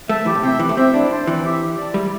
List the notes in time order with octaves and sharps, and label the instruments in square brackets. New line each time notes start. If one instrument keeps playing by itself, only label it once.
[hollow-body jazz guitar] A3 [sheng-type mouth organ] E5 A5
[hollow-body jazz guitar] E3 [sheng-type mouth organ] G4
[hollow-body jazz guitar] A2
[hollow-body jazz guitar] C3 [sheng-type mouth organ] E5 G5
[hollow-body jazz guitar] E3 [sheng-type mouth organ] G4
[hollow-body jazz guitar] A3
[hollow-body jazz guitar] C4 [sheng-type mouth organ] E5 G5
[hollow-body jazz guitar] D4 [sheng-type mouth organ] E4
[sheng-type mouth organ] C5 A5
[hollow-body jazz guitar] E3 [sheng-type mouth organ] C4
[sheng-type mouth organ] G4 E5
G4
D5 A5
[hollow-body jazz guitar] G3 [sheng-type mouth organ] E4